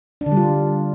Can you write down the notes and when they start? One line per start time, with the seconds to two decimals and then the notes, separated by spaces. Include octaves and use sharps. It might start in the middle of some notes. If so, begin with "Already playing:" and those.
0.21 D4
0.26 D3
0.31 G3
0.37 F4